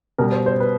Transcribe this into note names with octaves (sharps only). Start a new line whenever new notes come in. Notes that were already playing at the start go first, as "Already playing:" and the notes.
B2 G3 A#4
C5
C5
B4